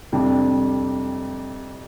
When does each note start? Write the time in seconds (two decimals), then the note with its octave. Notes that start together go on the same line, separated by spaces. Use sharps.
0.12 F2 C3 G3 D4